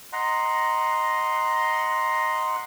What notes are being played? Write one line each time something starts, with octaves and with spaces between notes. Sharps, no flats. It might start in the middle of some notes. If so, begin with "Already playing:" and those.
D#5 F#5 A#5 C6